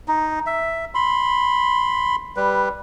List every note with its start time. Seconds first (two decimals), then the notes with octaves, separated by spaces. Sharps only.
0.08 D#4
0.46 E5
0.95 B5 C6
2.37 G3 B4